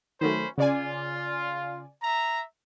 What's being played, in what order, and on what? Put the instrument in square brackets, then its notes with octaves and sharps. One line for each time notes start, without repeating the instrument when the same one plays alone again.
[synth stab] D#3 F#3 A3 [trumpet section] C#4 C5 B5
[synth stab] C#3 D5 G#5 [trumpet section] F4
[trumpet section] E5 A#5